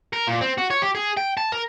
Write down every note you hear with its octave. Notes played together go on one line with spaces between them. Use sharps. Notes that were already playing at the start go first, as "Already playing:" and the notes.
A#4
A#2
C4
F#4
C#5
G4
G#4
G5
A5
A#4